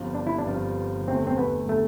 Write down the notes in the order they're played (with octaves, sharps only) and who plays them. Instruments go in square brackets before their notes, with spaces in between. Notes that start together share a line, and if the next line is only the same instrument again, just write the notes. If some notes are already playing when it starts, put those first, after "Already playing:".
Already playing: [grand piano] G1 G2 F3 C4 F4
[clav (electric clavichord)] D4
E4
D4
[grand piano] G1 G2 F3 C4 F4
[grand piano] F1 E2 D3 A3 [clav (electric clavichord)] C4
[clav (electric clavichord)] C4
B3
[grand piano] D3 [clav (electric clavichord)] A3